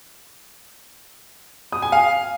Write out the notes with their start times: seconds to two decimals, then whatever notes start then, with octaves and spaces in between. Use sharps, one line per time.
1.72 D#6
1.82 G#5
1.92 F5